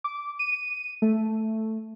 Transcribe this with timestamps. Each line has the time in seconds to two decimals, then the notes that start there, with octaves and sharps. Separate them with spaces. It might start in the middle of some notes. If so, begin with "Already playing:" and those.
0.04 D6
0.39 D#7
1.02 A3